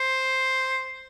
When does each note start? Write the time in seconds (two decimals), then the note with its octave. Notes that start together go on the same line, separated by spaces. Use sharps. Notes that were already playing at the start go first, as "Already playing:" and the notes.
Already playing: C5